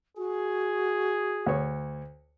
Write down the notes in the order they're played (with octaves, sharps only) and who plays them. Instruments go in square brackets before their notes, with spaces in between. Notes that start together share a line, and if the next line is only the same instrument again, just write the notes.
[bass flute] F#4 [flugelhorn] G#4
[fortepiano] D2 C#5